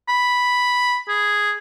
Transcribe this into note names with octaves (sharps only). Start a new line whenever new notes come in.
B5
G#4